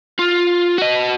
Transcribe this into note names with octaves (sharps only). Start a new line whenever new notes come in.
F4
F#4 D#5